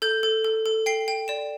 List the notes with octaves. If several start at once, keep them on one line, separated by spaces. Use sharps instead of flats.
A4 G6
A4
A4
A4
G5 C7
G5
D5 E7